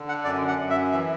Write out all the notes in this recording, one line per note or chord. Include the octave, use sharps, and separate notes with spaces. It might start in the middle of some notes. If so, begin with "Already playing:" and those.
Already playing: D3
F#5
F#2 D5
F#5
F#2
E5
E3 E5